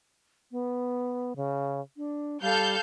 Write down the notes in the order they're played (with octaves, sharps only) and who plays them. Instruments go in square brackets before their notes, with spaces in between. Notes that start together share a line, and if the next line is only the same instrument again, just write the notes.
[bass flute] B3
C#3
D4
[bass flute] G3 [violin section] A4 F5 G6